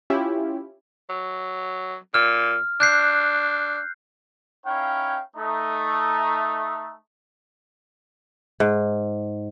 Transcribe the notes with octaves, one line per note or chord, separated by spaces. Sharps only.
C#4 E4 F4 G4
F#3
A#2 F6
D4 F#6 G6 C7
C#4 D#4 E4 C#5 F5 G5
A3 D#4
G#2